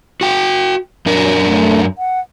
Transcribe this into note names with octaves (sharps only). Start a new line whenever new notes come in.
F#4 G5
F#2 F#3 D4 A#4
A3
F#5